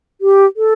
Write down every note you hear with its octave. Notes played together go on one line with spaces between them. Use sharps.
G4
A4